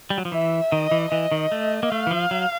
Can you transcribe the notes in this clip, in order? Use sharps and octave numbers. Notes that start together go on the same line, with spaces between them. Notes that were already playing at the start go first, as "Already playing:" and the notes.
G3
F#3
F3
E3 E5
D#3 D#5
E3
E3 D#5
D#3
A3
A#3
A3 F5
E3
F3
F#3